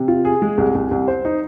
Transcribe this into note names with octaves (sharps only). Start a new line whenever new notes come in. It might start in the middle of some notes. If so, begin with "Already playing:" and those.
Already playing: C3
F4
G#4
G#3
C2
C2
C2
C5
D#4